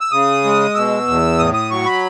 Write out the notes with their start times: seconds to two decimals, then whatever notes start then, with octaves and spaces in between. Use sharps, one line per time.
0.01 E6
0.12 C#3 D#6
0.44 G#3
0.75 B2 E6
1.08 E2
1.39 A2 D#6
1.54 D#6
1.71 F#3 C#6
1.86 B5